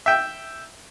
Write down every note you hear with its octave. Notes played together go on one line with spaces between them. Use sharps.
E5 G5